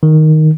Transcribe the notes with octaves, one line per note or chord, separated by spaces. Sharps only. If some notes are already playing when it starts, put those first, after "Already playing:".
D#3